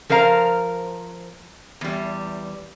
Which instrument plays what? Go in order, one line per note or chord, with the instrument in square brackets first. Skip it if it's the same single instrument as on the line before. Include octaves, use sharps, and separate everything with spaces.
[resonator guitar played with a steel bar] F3 A#4 C5 F5 A#5
E2 G3